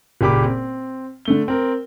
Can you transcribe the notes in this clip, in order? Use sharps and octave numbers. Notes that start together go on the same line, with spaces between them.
F#1 A#2 G4 B5 D6
C4
D3 A3 G7
C4 A#4